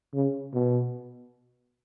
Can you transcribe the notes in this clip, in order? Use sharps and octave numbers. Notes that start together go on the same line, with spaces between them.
C#3
B2